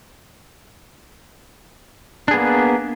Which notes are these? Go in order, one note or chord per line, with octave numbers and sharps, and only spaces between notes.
A#3 B3 D4 G#4